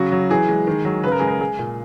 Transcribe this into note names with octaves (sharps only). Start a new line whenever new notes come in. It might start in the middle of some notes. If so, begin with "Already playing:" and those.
Already playing: C#3 F#3 F#4
F#3
E3 G#4
G#3
D#3
F#3
C#3 B4
A#4
G#3 G#4
A#4
G#3 G#4
A#2